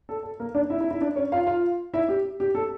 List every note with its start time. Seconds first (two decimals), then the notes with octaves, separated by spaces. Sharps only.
0.09 A4
0.23 A4
0.40 A#3 A#4
0.55 D4 D5
0.70 E4 E5
0.80 E4 E5
0.91 E4 E5
1.01 D4 D5
1.16 C#4 C#5
1.32 F4 F5
1.47 F4 F5
1.93 E4 E5
2.08 G4
2.40 G4
2.55 A4